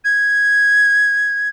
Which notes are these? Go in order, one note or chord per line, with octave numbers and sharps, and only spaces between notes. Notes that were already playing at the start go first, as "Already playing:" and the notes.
G#6